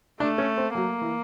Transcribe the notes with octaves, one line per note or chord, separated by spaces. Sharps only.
A3 D4
C#4
C4
F#3 A#3
E3